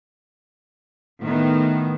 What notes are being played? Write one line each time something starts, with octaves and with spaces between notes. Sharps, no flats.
A2 D#3 B3